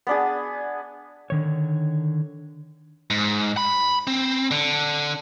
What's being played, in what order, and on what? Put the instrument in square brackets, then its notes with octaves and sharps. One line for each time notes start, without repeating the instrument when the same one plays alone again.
[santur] B3 D4 G#4
[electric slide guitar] D3 D#3 C#5
[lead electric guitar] G#2
B5
C4
D3